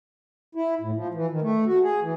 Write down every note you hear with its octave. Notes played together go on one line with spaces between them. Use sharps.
E4
A2
F3
E3
D#3
A3
F#4
G#4
E3